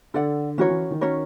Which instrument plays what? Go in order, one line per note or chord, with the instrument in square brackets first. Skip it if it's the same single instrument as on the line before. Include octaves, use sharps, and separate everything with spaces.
[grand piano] D3 [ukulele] A4 D5 F#5
[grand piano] E3 [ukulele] C#4 F#4 A#4 C#5
[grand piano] E3
D#3
[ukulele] C#4 F#4 A#4 C#5